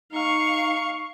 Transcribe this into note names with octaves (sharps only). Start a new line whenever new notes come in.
D#4 F5 C#6